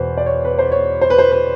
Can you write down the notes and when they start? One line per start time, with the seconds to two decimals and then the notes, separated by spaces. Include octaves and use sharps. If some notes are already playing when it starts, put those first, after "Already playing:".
Already playing: E2 B2 B4 C5
0.17 D5
0.26 C#5
0.45 B4
0.59 C5
0.72 C#5
1.01 C5
1.10 B4
1.18 C5
1.31 B4